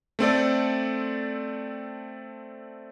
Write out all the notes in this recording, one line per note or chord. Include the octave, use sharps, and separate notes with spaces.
A3 C4 A4 D5